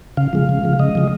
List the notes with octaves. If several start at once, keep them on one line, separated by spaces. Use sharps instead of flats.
C#3 F5
F3 G#3
C#3
F3 G#3
C#3 D#5
F3 G#3